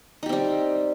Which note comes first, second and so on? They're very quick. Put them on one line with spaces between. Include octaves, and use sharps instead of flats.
D#4 G4 C4 G3